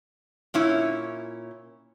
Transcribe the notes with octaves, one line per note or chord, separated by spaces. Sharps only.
A#2 C#4 E4 C#5